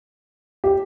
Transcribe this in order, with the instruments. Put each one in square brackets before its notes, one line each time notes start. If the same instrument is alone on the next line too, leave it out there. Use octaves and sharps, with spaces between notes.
[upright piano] G4